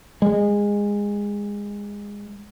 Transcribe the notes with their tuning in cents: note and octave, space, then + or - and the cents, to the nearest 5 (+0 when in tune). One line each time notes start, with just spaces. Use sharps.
G#3 -20